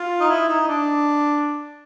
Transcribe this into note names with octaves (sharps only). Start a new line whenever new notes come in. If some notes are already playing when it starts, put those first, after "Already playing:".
Already playing: F4
D#4
E4
D#4
D4